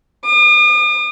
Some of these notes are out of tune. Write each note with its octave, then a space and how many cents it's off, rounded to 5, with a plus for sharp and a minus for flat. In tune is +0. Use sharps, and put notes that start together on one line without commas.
D#6 -45